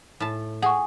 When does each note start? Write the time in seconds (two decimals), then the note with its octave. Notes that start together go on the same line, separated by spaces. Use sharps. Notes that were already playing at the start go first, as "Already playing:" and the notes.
0.20 A2 A5
0.62 G#4 F#5 C#6